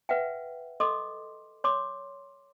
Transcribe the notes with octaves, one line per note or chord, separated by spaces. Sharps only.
B4 E5 F#5 G5
A4 D#5 C6 D6 D#6
C#5 C6 D6